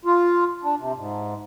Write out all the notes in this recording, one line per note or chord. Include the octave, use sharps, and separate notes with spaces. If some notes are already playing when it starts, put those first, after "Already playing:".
F4
D4
C3
G#2